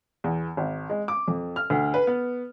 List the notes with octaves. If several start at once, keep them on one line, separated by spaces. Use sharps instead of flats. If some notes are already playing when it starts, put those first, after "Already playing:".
E2
G#1
G#3
D6
F2
F6
D2
B4
B3